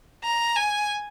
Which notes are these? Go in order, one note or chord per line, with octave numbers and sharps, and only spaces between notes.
A#5
G#5